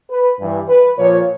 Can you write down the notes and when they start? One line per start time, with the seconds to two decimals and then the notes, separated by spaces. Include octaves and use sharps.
0.10 B4
0.40 G2 E3
0.69 B4
0.98 A#2 F3 C#5